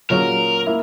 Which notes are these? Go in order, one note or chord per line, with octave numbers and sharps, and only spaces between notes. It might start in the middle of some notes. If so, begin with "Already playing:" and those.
A#2 F#3 C#4 G#4 A#4
A#3 E4